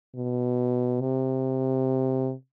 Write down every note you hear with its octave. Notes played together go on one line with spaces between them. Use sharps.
B2
C3